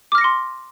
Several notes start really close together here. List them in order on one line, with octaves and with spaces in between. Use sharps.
D6 F6 A#6 C#7 C6